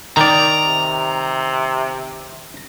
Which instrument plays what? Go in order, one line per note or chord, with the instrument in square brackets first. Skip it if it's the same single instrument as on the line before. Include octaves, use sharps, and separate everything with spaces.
[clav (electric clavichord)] D#3 D5 [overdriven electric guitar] A#5
[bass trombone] C3